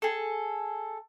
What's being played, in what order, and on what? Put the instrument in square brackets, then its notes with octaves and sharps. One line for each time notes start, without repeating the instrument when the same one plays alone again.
[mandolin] G#4 A4